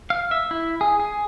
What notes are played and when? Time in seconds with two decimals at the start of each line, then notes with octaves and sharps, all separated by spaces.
0.10 F5
0.31 E5
0.51 E4
0.81 G#4
1.00 G#4